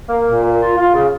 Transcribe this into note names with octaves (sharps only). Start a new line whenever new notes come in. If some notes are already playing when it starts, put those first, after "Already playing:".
A#3
A#2
A#3
F4
F4
C#3